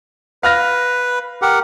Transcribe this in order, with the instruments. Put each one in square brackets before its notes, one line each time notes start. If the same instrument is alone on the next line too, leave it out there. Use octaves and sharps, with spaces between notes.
[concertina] B4 [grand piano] F5 F6 A#6
[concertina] G4 A#4 F#5